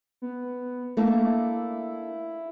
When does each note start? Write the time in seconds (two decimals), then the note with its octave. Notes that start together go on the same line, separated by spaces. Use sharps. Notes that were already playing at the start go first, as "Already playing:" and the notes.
0.22 B3
0.97 A3 A#3 D4 E4